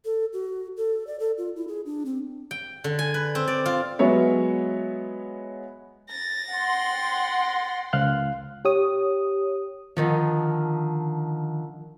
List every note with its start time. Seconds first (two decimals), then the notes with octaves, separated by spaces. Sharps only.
0.05 A4
0.33 F#4
0.77 A4
1.07 D5
1.20 A4
1.38 F4
1.56 E4
1.68 G#4
1.86 D4
2.06 C4
2.51 G5
2.84 D3
2.99 G#5
3.14 B4
3.35 C4
3.48 D5
3.66 F4
3.99 F#3 G#3 B3 C#5 E5
6.09 A6 A#6
6.52 F#5 G5 C6
7.93 C#2 F5 F#6
8.65 G4 C#5 D#6
9.97 D3 D#3 F3